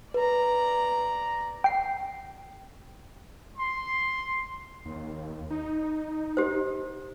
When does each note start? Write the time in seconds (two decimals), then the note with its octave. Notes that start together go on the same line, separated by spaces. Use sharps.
0.14 B4 D5 A#5
1.64 G5 C7
3.58 C6
4.85 D#2
5.50 D#4
6.37 G4 C5